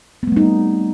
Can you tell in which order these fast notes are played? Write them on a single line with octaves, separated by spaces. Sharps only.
B3 A3 G3 D#4 C4